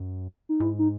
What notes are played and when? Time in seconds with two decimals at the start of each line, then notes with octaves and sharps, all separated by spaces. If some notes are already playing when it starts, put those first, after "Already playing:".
Already playing: F#2
0.49 D#4
0.60 G#2 E4
0.79 D#4